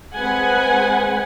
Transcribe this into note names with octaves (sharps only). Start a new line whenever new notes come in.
G#3 C4 B4 F#5 G#5